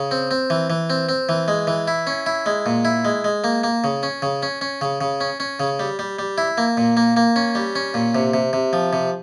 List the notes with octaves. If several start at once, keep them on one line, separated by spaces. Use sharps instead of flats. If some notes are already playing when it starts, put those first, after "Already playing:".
Already playing: C#3
C4
C4
E3
E3
C4
C4
E3
G#3
E3
E4
C#4
E4
G#3
A#2
E4
G#3
G#3
A#3
A#3
C#3
C#4
C#3
C#4
C#4
C#3
C#3
C#4
C#4
C#3
G3
G3
G3
E4
A#3
A#2
A#3
A#3
C#4
G3
C#4
A#2
C3
C3
C3
F3
C3